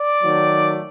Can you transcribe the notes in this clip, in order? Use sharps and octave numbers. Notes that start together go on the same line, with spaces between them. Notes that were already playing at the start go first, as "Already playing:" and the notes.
Already playing: D5
D#3 F#3 A3